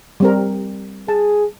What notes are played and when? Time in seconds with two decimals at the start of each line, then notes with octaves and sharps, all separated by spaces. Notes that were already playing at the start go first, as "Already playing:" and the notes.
0.20 G3 C4 A#4
1.08 G#4 A5